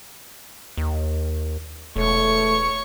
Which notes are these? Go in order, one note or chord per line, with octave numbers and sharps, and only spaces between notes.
D#2
E1 A3 C#5 C#6